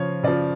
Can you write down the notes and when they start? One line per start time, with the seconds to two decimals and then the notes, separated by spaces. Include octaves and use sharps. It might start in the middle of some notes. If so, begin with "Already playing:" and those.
Already playing: C#3 F3 C#5
0.23 C#3 F3 D5